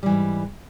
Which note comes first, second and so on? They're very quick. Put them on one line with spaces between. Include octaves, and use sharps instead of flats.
G3 E3 G#2